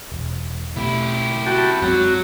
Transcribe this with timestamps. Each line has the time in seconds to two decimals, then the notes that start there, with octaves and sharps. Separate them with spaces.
0.12 E1
0.76 B2 A3 E4 G4
1.46 F#4 G5 A5
1.82 F#2 F#3 G#3 C4 F#4